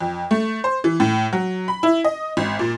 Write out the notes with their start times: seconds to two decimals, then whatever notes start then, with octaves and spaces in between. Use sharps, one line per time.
0.01 F2
0.31 A3
0.64 C5
0.84 E3
1.00 A2
1.33 F#3
1.68 B5
1.83 E4
2.05 D#5
2.37 G#1
2.59 A#2